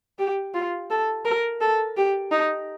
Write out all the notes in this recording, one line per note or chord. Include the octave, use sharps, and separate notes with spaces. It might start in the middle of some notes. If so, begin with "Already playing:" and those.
G4
F4
A4
A#4
A4
G4
D#4